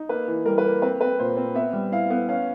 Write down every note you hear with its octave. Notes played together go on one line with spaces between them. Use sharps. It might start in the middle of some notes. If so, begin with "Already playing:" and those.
Already playing: D#4
A#3 B4
E3
G3 A#4
B4
A#3
C4 B4
C4 B4
A#2 C5
C4
B3 E5
G3
E4 F5
B3
C#4 F5